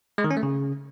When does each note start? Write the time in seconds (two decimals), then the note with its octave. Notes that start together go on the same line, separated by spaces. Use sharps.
0.18 G#3
0.24 D#3
0.31 C#4
0.37 A3
0.43 C#3